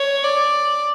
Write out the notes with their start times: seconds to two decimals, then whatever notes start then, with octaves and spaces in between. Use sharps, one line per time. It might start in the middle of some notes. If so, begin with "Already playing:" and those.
Already playing: C#5
0.24 D5